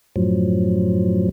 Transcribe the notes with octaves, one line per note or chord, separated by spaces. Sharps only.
F#2 A2 F3 F#3